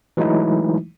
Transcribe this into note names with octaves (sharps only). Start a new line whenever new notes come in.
E3 F#3 G#3 A3 D#4 E4